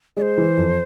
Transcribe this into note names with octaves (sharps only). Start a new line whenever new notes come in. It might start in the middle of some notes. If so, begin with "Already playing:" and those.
G#3 D5
C5
E3
F2